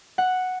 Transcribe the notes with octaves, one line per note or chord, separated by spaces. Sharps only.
F#5